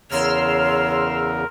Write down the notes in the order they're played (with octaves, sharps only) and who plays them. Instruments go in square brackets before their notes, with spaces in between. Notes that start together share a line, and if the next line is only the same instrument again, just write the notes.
[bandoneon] E2 C#3 [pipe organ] A#4 [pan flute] C#5 [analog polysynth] C6 E6 F6